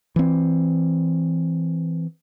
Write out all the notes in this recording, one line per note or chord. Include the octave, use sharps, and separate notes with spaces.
E3 C4